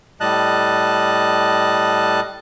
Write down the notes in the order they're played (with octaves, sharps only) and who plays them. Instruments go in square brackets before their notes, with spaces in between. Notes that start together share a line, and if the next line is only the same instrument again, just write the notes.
[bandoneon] A2 G3 D#5 A5 F#6